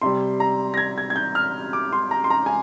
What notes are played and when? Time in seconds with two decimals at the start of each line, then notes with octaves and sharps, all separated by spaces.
0.02 C3 G3 C6
0.40 A#5
0.74 A#6
0.77 G#6
0.98 G#6
1.10 G#6
1.16 G6
1.35 F6
1.73 D6
1.93 C6
2.11 A#5
2.24 C6
2.30 A#5
2.46 G#5